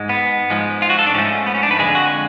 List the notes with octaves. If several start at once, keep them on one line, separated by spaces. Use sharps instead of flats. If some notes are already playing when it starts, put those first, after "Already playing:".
Already playing: G#2 G#3
B3
G#2 F3 G#3
F4
F#4
A4
D4
G#2 F3 A3 C#4
B3
C#4
D4
B4
F2 D3 G#3 G#4
F#4